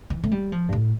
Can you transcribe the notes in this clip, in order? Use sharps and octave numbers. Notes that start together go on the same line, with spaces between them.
E3
A3
G3
F3
G2
A2